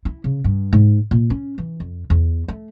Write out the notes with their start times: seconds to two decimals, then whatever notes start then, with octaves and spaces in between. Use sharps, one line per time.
0.05 E4
0.24 C#3
0.44 G2
0.73 G#2
1.11 A#2
1.30 C#4
1.58 E3
1.80 F2
2.10 E2
2.48 A3